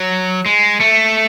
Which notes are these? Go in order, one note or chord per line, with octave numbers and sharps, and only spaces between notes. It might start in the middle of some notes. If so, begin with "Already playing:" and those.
Already playing: F#3
G#3
A3